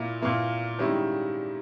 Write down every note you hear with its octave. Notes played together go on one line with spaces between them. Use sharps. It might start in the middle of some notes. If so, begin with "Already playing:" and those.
Already playing: A#2 A#3 E4
A#2 A#3 E4
G#2 D#3 G3 C#4 E4